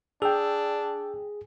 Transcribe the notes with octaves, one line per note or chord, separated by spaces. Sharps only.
D4 G#4 G5 E6